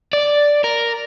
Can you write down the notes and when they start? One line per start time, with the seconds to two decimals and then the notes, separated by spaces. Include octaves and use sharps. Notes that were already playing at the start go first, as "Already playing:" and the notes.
0.13 D5
0.64 A#4